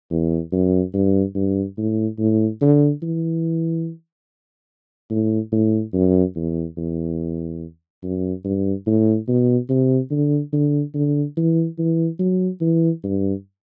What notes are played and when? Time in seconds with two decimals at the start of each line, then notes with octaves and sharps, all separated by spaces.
0.11 E2
0.52 F#2
0.94 G2
1.35 G2
1.78 A2
2.19 A2
2.61 D3
3.02 E3
5.11 A2
5.52 A2
5.94 F#2
6.36 E2
6.77 E2
8.03 F#2
8.44 G2
8.87 A2
9.28 B2
9.69 C3
10.11 D3
10.53 D3
10.94 D3
11.37 E3
11.78 E3
12.19 F#3
12.61 E3
13.04 G2